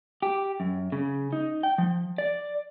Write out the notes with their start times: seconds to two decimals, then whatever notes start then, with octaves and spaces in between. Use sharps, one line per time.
0.22 G4
0.60 F#2
0.92 C#3
1.33 D#4
1.63 G5
1.78 F3
2.18 D5